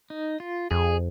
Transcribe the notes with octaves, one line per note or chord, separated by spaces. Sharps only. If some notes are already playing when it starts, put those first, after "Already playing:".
D#4
F4
F2 G#4